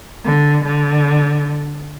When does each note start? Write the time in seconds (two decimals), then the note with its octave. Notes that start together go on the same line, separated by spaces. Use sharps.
0.24 D3
0.64 D3